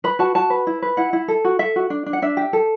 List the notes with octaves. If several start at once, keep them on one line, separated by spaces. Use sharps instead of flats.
B4 B5
F#4 A5
F#4 A5
B4
E4
B4
E4 F#5
E4
A4
F#4
A4 E5
F#4
D4
D4
F#5
D4 E5
G4
A4